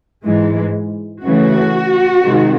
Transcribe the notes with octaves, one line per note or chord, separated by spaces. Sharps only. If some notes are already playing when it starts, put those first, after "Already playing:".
G#2 E3 G#3
C#3 E3 A3 F#4
C3 D#3 G#3 C4